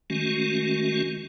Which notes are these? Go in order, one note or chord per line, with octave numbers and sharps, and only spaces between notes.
D#3 G#3 A3 C#4 F#4